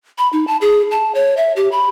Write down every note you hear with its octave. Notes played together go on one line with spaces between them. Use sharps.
B5
D#4
A5
G#4
A5
C#5
E5
G4
B5